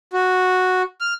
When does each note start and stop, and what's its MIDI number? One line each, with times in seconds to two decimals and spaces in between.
0.13 0.82 66
1.01 1.14 89